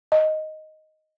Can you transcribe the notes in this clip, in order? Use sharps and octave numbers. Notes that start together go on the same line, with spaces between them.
D#5